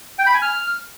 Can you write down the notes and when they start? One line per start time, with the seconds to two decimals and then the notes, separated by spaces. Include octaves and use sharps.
0.19 G5
0.26 B5
0.34 G#5
0.42 F6